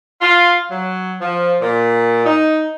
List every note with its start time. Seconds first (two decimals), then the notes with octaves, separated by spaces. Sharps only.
0.22 F4
0.71 F#3
1.21 F3
1.61 A#2
2.26 D#4